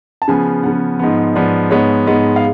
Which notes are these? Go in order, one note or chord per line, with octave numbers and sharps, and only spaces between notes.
A5
C#3 F3 B3 G#5
C#3 F3 B3 F#5
G#2 F3 B3
G#2 F3 B3 D5
G#2 G#3 B3 C#5
G#2 G#3 B3
F5